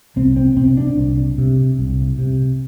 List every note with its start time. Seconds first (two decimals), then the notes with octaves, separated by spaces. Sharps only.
0.16 C2 C4
0.37 C4
0.57 C3 C4
0.77 D4
0.98 C2
1.38 C3
1.79 C2
2.19 C3